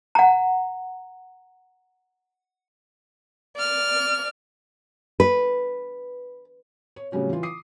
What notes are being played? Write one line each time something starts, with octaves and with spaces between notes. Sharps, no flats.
F#5 A#5
D5 F6
B4
C#5
A2 C#3 F#3 G3 C#4 F#4
E3 F4
D6 D#6 C7